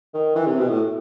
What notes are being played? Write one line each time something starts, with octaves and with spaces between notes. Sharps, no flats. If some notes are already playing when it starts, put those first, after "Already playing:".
D#3
E3
C3
B2
A2